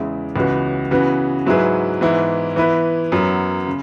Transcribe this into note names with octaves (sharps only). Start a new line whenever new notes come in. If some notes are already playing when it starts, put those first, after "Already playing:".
Already playing: E2 C#3 G#3 E4
C#2 C#3 E3 B3 F#4
C#3 E3 B3 F#4
G#2 F#3 E4 G#4 B4
G#2 E3 B3 E4
E3 B3 E4 B4
F#2 F#3 B3
C#3